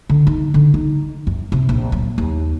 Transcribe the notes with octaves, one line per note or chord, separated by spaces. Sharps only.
D3
D#4
D3
D#4
F#2
C3
A#1
F#3
D#2